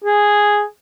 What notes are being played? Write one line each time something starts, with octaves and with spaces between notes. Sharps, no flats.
G#4